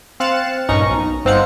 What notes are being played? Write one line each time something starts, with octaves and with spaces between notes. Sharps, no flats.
C4 F5 F#6 A6 C#7 E7
A#1 G2 C#4 D#4 A#5 C#6
B1
G1 C4 D#4 F5 F#5 C#7